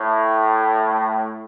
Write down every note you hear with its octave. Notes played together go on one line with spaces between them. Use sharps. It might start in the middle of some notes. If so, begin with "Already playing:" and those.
Already playing: A2